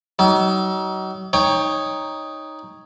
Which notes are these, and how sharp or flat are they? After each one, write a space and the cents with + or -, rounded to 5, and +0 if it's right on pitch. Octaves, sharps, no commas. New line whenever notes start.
F#3 +40 D#4 +25
D#4 +0 C#5 +0 G5 +25